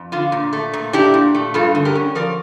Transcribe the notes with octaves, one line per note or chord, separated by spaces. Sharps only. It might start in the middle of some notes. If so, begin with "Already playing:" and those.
Already playing: F2
D3 F4
A#2
A3
A#2
D4 E4 G4
A#2
A3
G2 F4 A4
D3
G4 A#4
C#4
F3 A#4 D5